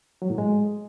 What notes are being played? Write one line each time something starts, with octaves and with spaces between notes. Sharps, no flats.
F#3
A2
G#3